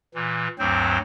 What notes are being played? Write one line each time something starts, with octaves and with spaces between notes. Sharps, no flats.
A#2 E3
D2 G2 F#3 C4 C5